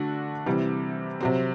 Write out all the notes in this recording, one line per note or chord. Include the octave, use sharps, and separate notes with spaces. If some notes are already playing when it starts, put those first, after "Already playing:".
Already playing: D3 A3 D4 F#4
C3 E3 G3
C3 F#3 C4